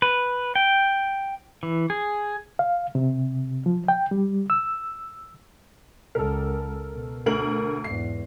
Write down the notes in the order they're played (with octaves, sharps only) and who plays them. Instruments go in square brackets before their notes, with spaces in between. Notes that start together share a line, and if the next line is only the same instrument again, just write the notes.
[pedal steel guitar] B4
G5
E3
G#4
[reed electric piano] F5
C3
F3
G5
G3
E6
[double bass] C#2 [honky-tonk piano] A4 A#4
[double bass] B2
[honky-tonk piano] D2 A#4 F#7
[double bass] E2 G#2 [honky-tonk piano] C7